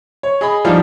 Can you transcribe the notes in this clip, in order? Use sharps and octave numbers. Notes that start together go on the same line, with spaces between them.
C#5
G#4 D#5 B5
F3 G3 D4 D#4 F4